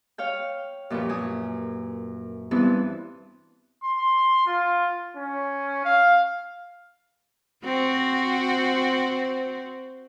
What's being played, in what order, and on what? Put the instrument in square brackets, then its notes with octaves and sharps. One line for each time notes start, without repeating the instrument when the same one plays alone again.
[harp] C#5 F5 G5
F#2 A#2 F3 G4 B4
F#2 G#5 D#6
G2 E3 B3 C4 E4
[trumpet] C6
F4
C#4
F5
[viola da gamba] C4 F#4 C5